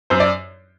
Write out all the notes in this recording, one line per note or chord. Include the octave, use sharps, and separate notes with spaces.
F#2 C5
D5